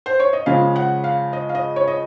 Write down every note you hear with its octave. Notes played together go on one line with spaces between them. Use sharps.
C5
C#5
D#5
C#3 F3 G#3 F5
F#5
F5
D#5
F5
D#5
C#5
D#5